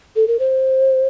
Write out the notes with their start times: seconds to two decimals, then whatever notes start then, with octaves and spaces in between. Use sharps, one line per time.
0.16 A4
0.27 A#4
0.39 C5